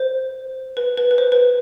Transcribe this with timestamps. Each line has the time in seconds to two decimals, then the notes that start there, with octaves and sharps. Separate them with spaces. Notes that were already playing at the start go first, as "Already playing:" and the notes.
Already playing: C5
0.77 B4
0.98 B4
1.11 B4
1.18 C5
1.32 B4